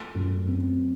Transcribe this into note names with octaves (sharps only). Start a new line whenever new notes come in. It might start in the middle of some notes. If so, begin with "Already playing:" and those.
Already playing: A3
F#2
C4